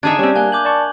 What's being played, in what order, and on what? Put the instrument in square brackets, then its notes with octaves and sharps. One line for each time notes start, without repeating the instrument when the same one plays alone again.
[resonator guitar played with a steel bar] D3 D#4 [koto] D4 G#4 E5 [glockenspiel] G#6
[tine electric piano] G3 [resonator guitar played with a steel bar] C4 C#4
[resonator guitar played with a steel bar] A#3 [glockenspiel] G#5 F#6 G7
[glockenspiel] D6 G6 F#7
[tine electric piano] D5 A5 C#6